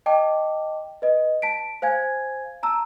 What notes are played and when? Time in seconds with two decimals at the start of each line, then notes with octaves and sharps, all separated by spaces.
0.06 D#5 G5 A5 D6
1.02 B4 D#5
1.42 A5 B6 D7
1.82 C5 F5 G#5 G#6
2.63 A5 A#5 E6